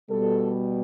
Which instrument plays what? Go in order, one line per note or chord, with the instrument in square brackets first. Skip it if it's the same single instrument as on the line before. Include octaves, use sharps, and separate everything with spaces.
[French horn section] B2 G3 A4